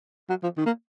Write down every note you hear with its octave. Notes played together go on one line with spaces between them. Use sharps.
F#3
F3
D#3
A#3